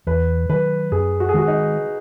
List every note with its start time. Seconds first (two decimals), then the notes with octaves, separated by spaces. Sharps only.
0.07 E2 B4
0.49 D#3 F#3 B4
0.92 F#2 G#4
1.20 F#4
1.29 G#4
1.34 D#3 G#3 F#4
1.48 D#4